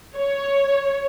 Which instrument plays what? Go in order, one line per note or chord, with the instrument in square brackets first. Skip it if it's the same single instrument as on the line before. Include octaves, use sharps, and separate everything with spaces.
[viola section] C#5